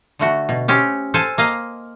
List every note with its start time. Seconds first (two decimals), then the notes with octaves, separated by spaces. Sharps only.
0.19 D3 A3 F#4
0.49 B2
0.68 C4 C#4 G4
1.14 A4 C5 F5 G#5 A5
1.38 A#3 D#5 F5